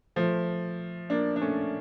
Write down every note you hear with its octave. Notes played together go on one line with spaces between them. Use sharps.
F3 A3
A#3 D4
D4
A3 C#4